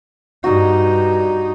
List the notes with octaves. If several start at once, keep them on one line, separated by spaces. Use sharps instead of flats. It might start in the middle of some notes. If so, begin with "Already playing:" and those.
G2 D#4 F#4